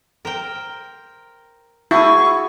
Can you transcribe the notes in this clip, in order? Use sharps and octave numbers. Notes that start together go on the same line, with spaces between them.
A#4 C5 G5
E4 F#4 G#4 C#6